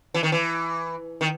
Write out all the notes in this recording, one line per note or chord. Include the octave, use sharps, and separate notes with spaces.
E3
D#3
E3
D#3